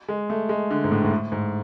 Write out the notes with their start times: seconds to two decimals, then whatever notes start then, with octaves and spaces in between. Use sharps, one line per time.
0.08 G#3
0.30 A3
0.49 G#3
0.71 D3
0.84 G#2
0.91 A2
1.04 G#2
1.11 A2
1.32 G#2